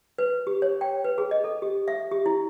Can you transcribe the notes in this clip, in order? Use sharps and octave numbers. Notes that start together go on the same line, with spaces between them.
B4
G4
C#5
G5
B4
G#4
D#5
A4
G4
E5
G4
E4